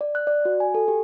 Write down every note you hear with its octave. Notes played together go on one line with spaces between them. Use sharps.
D5
F#6
D5
F#4
G#5
A4
G4